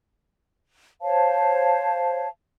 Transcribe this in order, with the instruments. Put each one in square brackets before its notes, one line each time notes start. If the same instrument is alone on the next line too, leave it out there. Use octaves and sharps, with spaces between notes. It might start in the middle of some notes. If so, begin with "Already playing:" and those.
[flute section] C5 C#5 F5 A5